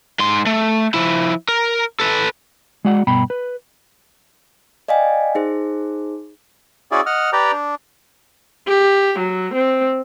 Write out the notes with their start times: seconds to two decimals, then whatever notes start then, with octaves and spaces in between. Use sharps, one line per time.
0.19 G#2 C6
0.46 A3
0.94 F3 E4
1.48 A#4
2.00 A4 B4
2.85 G#3 F#4 D5 F#5
3.07 G2 B2 G5 B5
3.30 B4
4.88 D5 D#5 F5 G5 G#5
5.35 D#4 G#4 C5
6.91 C#4 E4 F#4 G#4 D5
7.06 D#5 F#5 F6
7.33 G4 B4 D5 G5 A#5
7.52 D4
8.68 G4
9.19 F#3
9.54 C4